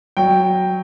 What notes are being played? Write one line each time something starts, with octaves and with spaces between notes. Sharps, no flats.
F#3 G5